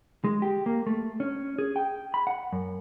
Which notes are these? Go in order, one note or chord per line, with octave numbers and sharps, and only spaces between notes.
G#3
G4
A#3
A3
C#4
G#4
G5
B5
F#5
F#2